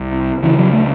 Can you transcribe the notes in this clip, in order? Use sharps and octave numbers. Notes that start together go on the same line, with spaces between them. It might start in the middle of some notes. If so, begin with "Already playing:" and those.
Already playing: C2 C3
C#2 C#3 E3
F#3
A3